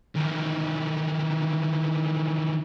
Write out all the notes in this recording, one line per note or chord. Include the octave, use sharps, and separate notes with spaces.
D#3 E3